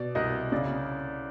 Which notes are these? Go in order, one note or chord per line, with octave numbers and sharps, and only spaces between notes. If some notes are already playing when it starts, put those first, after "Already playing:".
Already playing: B2 D5
C2 D#5
C#3 D5